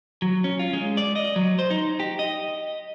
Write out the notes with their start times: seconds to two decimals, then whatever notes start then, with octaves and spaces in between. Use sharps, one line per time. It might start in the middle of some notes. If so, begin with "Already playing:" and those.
0.22 F#3
0.44 C#4
0.59 F4
0.73 G#3
0.97 D5
1.16 D#5
1.36 F#3
1.59 C5
1.71 D#4
2.00 G4
2.19 D#5